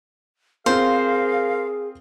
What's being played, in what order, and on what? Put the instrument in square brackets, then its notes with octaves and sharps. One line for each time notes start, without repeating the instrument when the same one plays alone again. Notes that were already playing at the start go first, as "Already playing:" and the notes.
[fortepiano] C4 F4 [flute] G#4 [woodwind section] A#4 F5 [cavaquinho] C5